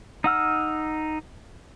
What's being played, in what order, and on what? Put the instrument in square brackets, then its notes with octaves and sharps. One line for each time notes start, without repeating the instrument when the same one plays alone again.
[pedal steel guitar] D#4 F#5 E6 F6